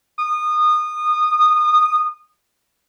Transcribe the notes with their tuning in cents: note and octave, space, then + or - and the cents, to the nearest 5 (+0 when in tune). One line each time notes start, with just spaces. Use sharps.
D#6 -25